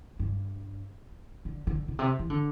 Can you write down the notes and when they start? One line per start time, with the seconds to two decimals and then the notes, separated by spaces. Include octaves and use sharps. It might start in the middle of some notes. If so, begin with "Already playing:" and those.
0.19 G2
1.45 D3
1.67 D3
1.88 B2
1.99 C3
2.19 E3
2.30 D3